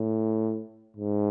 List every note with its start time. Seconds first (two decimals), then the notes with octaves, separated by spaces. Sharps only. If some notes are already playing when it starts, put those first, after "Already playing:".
Already playing: A2
0.97 G#2